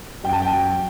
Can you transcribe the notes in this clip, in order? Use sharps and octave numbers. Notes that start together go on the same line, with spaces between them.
F#2 G5
A5
G5
F#3